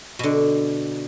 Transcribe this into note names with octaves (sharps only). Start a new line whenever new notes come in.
B2 D3